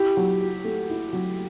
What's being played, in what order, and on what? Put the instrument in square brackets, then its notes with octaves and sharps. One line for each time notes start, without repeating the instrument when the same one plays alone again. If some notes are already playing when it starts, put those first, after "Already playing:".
Already playing: [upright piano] E4 [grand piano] G4
[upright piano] F#3
G4
A3
E4
F#3